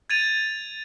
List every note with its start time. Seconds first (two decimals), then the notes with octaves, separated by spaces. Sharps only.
0.10 G#6 A6 D#7 F7